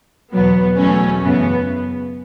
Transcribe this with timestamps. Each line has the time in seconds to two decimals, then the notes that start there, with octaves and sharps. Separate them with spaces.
0.33 E2 B2 F#3 B3
0.77 E2 B2 F#3 A3 C#4
1.22 F#2 C#3 E3 B3